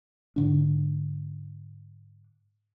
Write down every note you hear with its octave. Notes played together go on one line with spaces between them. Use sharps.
G#2 D3 D4